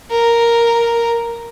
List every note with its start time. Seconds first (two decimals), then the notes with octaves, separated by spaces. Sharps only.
0.11 A#4